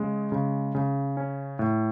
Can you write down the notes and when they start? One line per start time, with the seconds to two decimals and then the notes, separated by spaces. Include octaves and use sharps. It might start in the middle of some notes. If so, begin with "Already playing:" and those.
Already playing: C#3 G#3
0.32 C#3
0.75 C#3
1.17 C#4
1.59 A2